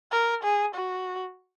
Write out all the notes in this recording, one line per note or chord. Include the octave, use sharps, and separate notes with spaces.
A#4
G#4
F#4